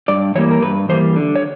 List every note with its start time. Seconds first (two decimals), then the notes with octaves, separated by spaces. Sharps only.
0.08 G2 D5
0.35 E3 G3 A#3 C#5
0.51 A#4
0.62 G2 B4
0.89 E3 G3 A#3 C5
1.16 D3
1.36 C#5